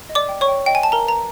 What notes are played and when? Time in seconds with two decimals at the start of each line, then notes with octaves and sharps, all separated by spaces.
0.09 D#5
0.15 D5 D6
0.29 G5
0.41 C#5 C#6
0.48 G5
0.66 D#5 G5
0.75 G#5
0.83 G5 A5
0.92 A#4 A#5
1.05 B4 A#5